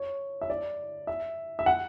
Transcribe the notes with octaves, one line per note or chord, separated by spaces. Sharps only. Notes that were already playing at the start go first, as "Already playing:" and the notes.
Already playing: C#5
E5
D5
E5
E5
F#5